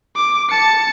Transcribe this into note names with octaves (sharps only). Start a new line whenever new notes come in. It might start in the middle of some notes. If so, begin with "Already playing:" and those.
D6
A5 C#7